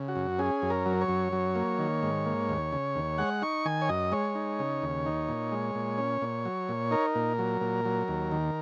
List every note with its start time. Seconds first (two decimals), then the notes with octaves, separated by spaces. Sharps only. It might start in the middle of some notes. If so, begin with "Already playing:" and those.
Already playing: C#3
0.08 F#4
0.16 F#2
0.39 C#4 G#4
0.62 F#2
0.70 A#4
0.86 F#3
1.01 C#5
1.09 F#2
1.33 F#3
1.55 A#3
1.78 D#3
2.03 G#2
2.26 A#3
2.49 D#2
2.72 C#3
2.95 D#2
3.18 G#3 F#5
3.42 D#4 C#6
3.65 D#3 G#5
3.82 C#5
3.89 F#2 D#5
4.12 G#3 C#5
4.35 D#4
4.59 C#3
4.82 D#2
5.06 D#4
5.29 A#2
5.52 G#3
5.75 A#2
5.98 C#4
6.22 A#2
6.45 F#3
6.69 A#2
6.91 D#4 A#4
7.15 A#2
7.39 F#3
7.61 A#2
7.85 F#3
8.08 D#2
8.31 D#3